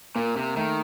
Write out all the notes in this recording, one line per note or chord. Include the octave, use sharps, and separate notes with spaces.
A#2 A#3
C3 A#3
D#3 A3